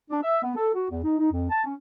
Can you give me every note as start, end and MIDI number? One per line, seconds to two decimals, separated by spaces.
0.10 0.19 62
0.23 0.42 76
0.43 0.56 59
0.56 0.70 69
0.74 0.90 66
0.90 1.03 40
1.04 1.15 63
1.19 1.28 63
1.32 1.50 41
1.50 1.62 81
1.65 1.75 61